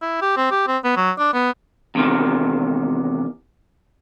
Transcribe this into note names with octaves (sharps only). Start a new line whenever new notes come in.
E4
G4
C4
G4
C4
B3
F#3
D4
B3
E2 C3 D#3